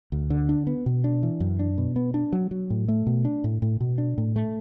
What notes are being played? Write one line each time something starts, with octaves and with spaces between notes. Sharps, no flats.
D2
D3
D4
B3
B2
D4
E3
F#2
D4
B2
B3
D4
F#3
F#3
A2
A3
B2
D4
A2
A2
B2
D4
A2
A3